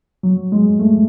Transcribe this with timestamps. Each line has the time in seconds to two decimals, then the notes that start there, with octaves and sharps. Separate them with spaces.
0.23 F#3
0.52 G#3
0.79 A3